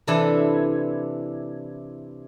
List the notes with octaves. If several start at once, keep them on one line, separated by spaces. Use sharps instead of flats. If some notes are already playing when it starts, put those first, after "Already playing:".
C3 E3 D4 E4 A4